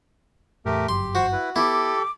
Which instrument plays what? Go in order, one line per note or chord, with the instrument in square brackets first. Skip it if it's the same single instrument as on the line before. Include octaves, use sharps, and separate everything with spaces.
[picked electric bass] E2 A2 [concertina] A3 G4 A#4
[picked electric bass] G1 F#2 [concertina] G4 [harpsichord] C6
[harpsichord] F#4 [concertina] C5 C#6
[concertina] E4 B4
[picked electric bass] B3 [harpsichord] E4 [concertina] G4 A4 [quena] D6